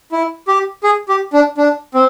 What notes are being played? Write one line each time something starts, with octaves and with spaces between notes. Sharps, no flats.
E4
G4
G#4
G4
D4
D4
C4